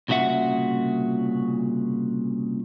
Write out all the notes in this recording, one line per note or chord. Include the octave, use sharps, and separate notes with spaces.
C2 A#2 C#3 F#4 E5 F#5